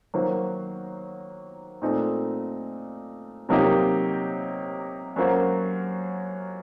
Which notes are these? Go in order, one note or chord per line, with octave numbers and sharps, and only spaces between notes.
D#3 F#3 A#3 F#4 C5
A#2 A3 C4 D#4
C3 F#3 A#3 D#4 G4
F#2 F#3 A#3 F#4 C5